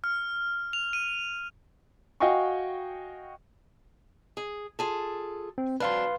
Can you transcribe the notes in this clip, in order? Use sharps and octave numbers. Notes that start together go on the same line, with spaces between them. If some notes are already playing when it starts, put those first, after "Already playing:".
F6
F7
D#7
F#4 D#5 F5 G5 G#5 C#6
G#4
F4 G#4 A4
C4
F#3 C4 D4 B4 F5 C6